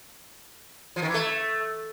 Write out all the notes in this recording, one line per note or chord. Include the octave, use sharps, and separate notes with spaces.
F3
D#3
E3
A3